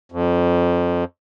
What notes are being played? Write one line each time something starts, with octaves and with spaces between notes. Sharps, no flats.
F2